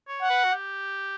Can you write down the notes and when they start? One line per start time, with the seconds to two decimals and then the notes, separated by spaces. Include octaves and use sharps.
0.08 C#5
0.22 F#5
0.29 B4
0.44 F#4
0.52 G4